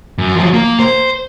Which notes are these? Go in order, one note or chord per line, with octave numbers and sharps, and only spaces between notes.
F#2
F3 F#3
A#3
C5